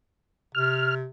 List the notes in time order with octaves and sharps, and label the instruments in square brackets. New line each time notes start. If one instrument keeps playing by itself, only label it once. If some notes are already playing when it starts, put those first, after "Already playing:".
[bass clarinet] C3 [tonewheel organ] F6